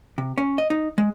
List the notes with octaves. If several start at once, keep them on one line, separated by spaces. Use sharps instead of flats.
C3
C#4
D#5
D#4
G#3